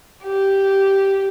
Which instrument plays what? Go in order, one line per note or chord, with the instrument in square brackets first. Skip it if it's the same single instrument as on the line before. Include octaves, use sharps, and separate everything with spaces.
[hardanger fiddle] G4